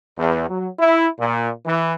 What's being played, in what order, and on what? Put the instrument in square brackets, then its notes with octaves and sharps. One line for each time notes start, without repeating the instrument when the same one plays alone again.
[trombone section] E2
F#3
E4
A#2
E3